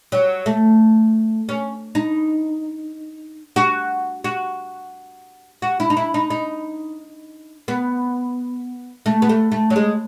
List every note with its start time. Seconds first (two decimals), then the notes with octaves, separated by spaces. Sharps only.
0.12 F#3
0.46 A3
1.49 C#4
1.95 D#4
3.56 F#4
4.24 F#4
5.62 F#4
5.80 E4
5.90 D#4
5.97 E4
6.14 D#4
6.30 D#4
7.68 B3
9.06 A3
9.22 B3
9.29 A3
9.52 A3
9.70 F#3
9.76 G#3